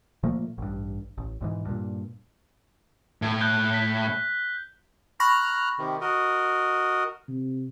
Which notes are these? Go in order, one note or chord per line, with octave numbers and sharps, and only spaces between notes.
A#2 F3 A3 A#3
A1 G2
A1
B1 G#2 E3
G2 A#2
A2
F#6 G6 G7
B6
A#5 B5 C#6 F6 F#6 A#6
C3 D#3
F#4 A#4 D#5
C3